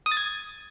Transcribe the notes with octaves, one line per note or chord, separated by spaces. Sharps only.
D#6
A6
G#6